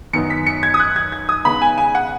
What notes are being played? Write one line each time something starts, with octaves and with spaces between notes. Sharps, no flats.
F#2 D#3 B3 D#4 C#7
B6
C#7
G#6
D#6
F#6
G#6
G#6
D#6
C#3 G#3 B3 D#4 B5
G#5
G#5
F#5